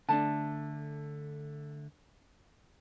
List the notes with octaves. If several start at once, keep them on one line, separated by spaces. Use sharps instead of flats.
D3 A3 D4 A5